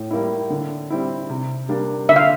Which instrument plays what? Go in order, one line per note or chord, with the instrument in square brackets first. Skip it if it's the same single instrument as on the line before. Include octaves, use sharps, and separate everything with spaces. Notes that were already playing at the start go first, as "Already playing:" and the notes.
Already playing: [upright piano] A2
G3 A#3 E4
D3
G3 C4 E4
C3
G3 A#3 D4
[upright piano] D3 [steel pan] E5
[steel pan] F5